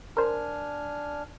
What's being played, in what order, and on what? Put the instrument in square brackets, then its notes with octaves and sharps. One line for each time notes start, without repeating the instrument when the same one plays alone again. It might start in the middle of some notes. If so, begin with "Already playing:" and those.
[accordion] D4 G#5 F6 [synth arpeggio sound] A#4 C5